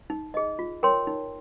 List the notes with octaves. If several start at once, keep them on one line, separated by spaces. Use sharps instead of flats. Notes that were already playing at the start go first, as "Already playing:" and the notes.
D#4
G#4 D#5
F4
A#4 C#5 G5 C6
D#4